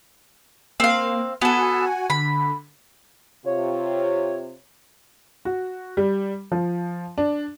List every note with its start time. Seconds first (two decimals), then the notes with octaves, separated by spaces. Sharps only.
0.80 A#3 C4 F5
1.42 B3 F#4 A4 F#5 G#5
2.10 D3 B5
3.45 C3 F4 C#5
5.45 F#4
5.97 G3
6.52 F3
7.18 D4